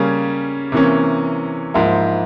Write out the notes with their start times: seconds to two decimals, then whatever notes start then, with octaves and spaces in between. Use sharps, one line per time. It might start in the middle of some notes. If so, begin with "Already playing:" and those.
Already playing: C#3 G3 A#3 C#4
0.72 C3 E3 A#3 C#4
1.74 G#2 F3 A#3 E4